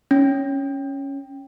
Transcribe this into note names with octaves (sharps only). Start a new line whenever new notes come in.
C#4